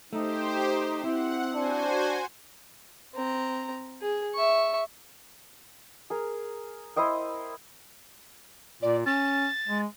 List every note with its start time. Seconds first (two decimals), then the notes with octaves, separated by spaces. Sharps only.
0.13 A3 D#4 G4 C5
1.04 C4 E4 F#5
1.54 D4 F#4 C5 G#5
3.15 C4 A#5
4.02 G#4
4.34 E5 C#6
6.10 G#4 A#4
6.96 E4 C5 D#5 G5
8.82 A#2 D5
9.06 C#4 A6
9.68 G#3